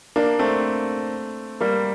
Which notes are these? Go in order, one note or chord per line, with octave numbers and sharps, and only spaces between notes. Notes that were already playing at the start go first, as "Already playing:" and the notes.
A#3 D4
A3 C4
G3 A#3